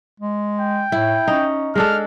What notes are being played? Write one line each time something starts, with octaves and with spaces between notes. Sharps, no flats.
G#3
G5
A2 E4
C#4 D#4
G#3 D4 A4 F6